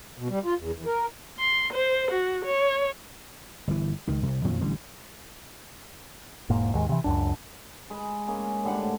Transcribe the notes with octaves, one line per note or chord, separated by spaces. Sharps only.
B2
G3
F4
E2
E2
A#4
C6
C5
F#4
C#5
G1 E3
C#2 D#3
C2
F2 A#2 D#3 F#3
A1 D3 G3
E1 G#2 A#3
D#2 G#2 D#3 G#3
C3 E3
C#2 F#2 D4
G#3 B4
G#3 A#3 C#4
A2 D3 G3 F#5
G#2